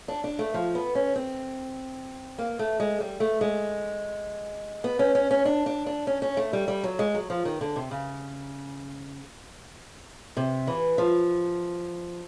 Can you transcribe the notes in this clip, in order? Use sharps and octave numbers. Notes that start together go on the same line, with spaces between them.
D4
D4
A3
F3
B3
C#4
C4
A#3
A3
G#3
G3
A3
G#3
B3
C#4
C#4
C#4
D4
D4
D4
C#4
C#4
A3
G3
G3
F#3
G#3
F#3
F3
D#3
D3
C3
C#3
C3
E3
F3